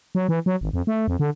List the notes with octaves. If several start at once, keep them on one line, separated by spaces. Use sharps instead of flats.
F#3
E3
F#3
G#1
F2
A3
F2
D3